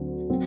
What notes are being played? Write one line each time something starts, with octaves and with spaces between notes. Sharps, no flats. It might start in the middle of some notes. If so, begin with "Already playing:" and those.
Already playing: D2 D3 F#3 C4
F#3 C4